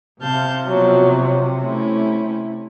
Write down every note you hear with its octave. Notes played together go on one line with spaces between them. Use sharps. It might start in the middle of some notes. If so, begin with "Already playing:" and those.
C3 F5 A5 G6
B2 F3 F#3
A3 C#4 E4